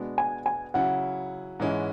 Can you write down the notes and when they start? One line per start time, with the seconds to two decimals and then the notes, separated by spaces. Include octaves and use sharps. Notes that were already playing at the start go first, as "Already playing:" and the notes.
Already playing: B2 G#3 B3 D4
0.18 G#5
0.46 G#5
0.74 C#3 F#3 C#4 E4 F#5
1.60 G#2 E3 G#3 C#4 E4